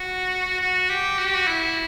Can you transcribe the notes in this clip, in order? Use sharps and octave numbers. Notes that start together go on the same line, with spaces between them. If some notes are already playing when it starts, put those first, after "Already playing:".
Already playing: F#4
F#4
G4
F#4
G4
F#4
E4